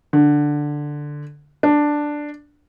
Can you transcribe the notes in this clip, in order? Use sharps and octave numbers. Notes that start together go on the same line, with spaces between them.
D3
D4